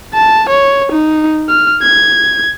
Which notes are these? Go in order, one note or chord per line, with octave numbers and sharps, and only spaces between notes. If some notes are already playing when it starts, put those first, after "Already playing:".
A5
C#5
D#4
F6
G#6